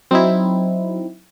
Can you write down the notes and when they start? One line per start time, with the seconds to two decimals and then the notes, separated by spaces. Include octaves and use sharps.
0.11 F#3 C4 D#4 E4